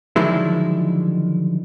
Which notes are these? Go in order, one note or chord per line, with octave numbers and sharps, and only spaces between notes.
D3 D#3 F3 F#3 G#3 E4